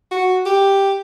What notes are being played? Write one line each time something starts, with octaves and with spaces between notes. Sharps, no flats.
F#4
G4